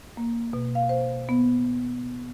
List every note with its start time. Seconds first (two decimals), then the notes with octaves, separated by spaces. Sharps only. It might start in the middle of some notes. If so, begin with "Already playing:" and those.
0.17 A#3
0.53 B2
0.75 F5
0.89 C5
1.29 B3